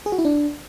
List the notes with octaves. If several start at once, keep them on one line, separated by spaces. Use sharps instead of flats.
G#4
F#4
E4
D4